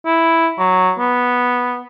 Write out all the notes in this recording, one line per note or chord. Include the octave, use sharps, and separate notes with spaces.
E4
F#3
B3